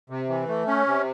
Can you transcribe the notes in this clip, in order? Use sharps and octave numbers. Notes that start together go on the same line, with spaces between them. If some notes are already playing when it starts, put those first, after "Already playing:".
C3
E3
A3
C#4
C3